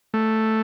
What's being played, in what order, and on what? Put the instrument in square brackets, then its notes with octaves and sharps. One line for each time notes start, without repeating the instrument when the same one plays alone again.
[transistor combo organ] A3